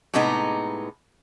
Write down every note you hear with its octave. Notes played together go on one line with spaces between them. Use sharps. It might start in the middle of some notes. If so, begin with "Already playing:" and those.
A2 C3 G#3 B3 D#4